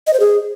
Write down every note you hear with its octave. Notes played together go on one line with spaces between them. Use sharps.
D#5
C5
G#4